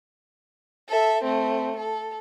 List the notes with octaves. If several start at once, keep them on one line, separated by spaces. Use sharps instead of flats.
A4 E5
A3 C4
A4